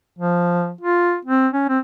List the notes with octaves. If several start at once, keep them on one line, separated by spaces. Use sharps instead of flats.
F3
F4
C4
C#4
C4